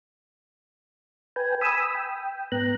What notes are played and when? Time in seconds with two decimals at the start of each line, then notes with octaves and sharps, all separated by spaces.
1.36 B4 G5 G#5
1.61 G#5 B5 D#6 E6
1.95 G5
2.52 G#2 B3 A#5 F#6